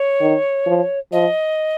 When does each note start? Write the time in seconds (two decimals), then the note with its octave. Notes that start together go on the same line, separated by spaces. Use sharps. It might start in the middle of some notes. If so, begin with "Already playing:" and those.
Already playing: C#5
0.21 D#3
0.66 F3
1.12 F3 D#5